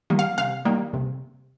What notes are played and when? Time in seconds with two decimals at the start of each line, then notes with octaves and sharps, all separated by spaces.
0.10 D#3 G3 A#3
0.19 F5
0.38 C3 F5
0.65 D#3 G3 A#3
0.93 C3